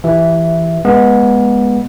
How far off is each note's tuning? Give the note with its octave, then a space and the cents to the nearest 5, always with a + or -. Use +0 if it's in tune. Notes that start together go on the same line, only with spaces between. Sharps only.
E3 +10 G4 +0 E5 +0
G#3 +0 B3 -20